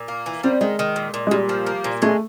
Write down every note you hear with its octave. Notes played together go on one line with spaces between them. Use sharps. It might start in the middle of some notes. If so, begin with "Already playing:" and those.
Already playing: A#2
A#3
E3
G3 C4
D#3 G#3
D#3
A#2
A#2
G#3
A#2 G3
F3
A#3
A#2
G#3 A3